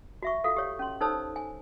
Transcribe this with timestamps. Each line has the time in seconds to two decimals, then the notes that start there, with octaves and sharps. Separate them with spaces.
0.23 F#4 E5 C#6
0.44 F4 F#4 A4 F5
0.56 G4 C#5
0.79 C#4 C6
1.01 D#4 A4 C5 C#5 A5 E6
1.36 G#5